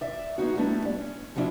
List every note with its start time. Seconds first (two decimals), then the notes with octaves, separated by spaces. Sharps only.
0.01 D5 E5
0.38 G#3 B3 D#4 F#4
0.56 G3 A3 B3 D4 E4
0.85 D5
0.99 C#4
1.36 F3 F#3 B3 D4 E4 F4